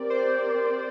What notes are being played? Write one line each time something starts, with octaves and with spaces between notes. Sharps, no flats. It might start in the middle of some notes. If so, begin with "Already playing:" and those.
Already playing: C4 G4 A#4 D5
C5